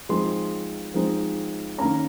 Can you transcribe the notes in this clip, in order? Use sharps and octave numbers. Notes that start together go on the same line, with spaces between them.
F3 G#3 C4 D#4 C6
F3 G#3 C4 D#4
D#3 A#3 C#4 A#5